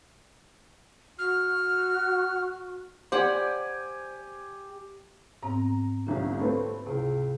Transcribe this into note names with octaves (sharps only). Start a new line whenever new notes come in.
F#4 F6
G4 C5 D5 F#5 G#5 B5
G#2 B3 C4 A#5
G1 C2 D3 C#4 G4
A3 C4 B4 C#5
C#2 C3 E4